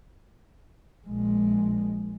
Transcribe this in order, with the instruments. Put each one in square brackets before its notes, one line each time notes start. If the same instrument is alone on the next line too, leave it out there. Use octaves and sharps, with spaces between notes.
[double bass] A#1 G#3